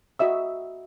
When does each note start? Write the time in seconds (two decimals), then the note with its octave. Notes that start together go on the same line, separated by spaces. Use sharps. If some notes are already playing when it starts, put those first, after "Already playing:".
0.19 F#4 D#5 E5 E6